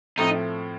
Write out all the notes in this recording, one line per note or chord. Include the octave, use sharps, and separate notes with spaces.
A2 F3 A3 C4 D#4